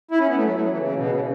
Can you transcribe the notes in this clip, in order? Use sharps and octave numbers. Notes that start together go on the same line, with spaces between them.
E4
C#4
B3
A3
F#3
A3
F#3
E3
C#3
B2
C#3